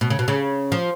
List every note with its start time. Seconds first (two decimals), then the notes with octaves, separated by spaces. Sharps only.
0.01 B2
0.10 C#3
0.19 B2
0.28 C#3
0.72 F3